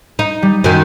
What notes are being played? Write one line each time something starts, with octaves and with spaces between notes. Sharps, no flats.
D#4
G3
F#2 D#3